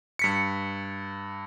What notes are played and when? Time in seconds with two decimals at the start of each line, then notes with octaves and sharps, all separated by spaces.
0.19 G2 B6 C#7